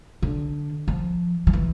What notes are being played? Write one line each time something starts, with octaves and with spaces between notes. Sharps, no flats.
D3
F3
F3
E3